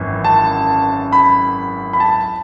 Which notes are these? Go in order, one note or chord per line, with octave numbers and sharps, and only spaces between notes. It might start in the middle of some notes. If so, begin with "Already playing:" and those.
Already playing: G#1 F#2 E3
A5
B5
B5
A5